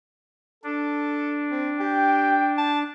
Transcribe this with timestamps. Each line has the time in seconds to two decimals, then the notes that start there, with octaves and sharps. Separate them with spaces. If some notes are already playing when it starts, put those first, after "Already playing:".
0.64 D4 A4
1.50 C4
1.80 G4 G5
2.58 A5